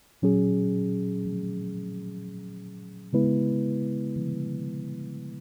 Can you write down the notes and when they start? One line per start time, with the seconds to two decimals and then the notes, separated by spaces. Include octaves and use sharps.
0.22 A#2 F#3 C#4 G#4
3.13 C#3 G#3 B3 E4 B4